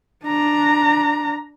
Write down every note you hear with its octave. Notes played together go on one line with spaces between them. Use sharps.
D4 A#5